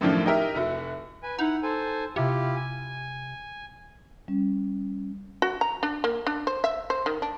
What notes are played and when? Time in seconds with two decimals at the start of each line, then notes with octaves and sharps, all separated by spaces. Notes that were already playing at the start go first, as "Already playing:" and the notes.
0.01 F#2 A2 D#3 F3 A3 D4
0.26 D#4 E4 G4 A#4 E5
0.55 F1 E4 F#4
1.23 B4 G#5
1.39 D#4 E4 F#5
1.63 A4 C5 G#5
2.16 C3 E4 F4 G4
2.56 G#5
4.28 G3 C#4
5.42 F#4
5.61 A#5
5.83 D4
6.04 A#3
6.27 D4
6.47 C5
6.64 E5
6.90 C5
7.06 D#3
7.22 D4